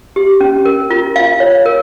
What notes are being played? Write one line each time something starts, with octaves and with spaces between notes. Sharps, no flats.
G4
C#4
A#4
F4
F4 F5
C#5
A#4